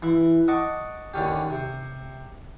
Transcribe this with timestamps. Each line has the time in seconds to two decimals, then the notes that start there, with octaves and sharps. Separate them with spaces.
0.02 E3 E4
0.48 D#5 F#5 A5 C#6 D6
1.14 D#2 D3 C#4 G4
1.50 C3